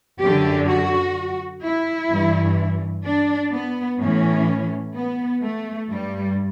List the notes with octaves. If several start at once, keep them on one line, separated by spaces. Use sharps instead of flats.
F#2 D3 G4
F#4
E4
G2 E3
D4
B3
A2 E3 C#4
B3
A3
G2 G3